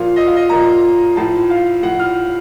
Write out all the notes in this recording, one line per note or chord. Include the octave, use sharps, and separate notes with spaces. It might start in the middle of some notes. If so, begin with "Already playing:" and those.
Already playing: A#2 F3 F5
D#5
F5
D#5
A#2 F3 A#5
A2 F3 A5
F5
A2 F3 F#5
F6